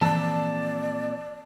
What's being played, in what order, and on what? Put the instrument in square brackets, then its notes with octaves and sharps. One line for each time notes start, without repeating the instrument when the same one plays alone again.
[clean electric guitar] A#2 C4 A4 [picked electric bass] E3 F3 [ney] D5 [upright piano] A5